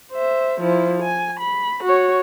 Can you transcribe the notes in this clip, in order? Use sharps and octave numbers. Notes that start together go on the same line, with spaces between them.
C5 E5
F3 E4
G#5
B5
F#4 C#5